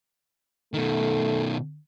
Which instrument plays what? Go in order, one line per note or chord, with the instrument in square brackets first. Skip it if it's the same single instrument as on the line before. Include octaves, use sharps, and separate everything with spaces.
[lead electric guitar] B2 D#3 [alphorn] A3